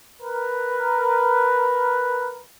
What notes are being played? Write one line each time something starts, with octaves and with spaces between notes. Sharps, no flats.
A#4 B4